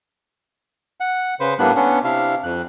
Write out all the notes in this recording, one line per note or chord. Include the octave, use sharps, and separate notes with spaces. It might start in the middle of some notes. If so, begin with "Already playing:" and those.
F#5
C#3 B4 C5
A2 G3 A#3 B3 D4 F#6
B3 C#4 D4
C3 D4 E4 F5
F2 F#6